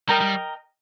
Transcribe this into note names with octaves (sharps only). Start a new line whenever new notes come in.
G3 A#4 D#5 G5 A#5
G3